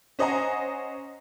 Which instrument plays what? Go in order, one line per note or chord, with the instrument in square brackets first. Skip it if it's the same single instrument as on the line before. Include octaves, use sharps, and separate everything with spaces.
[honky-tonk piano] C#4 C5 D#5 F#5 G#5 A#5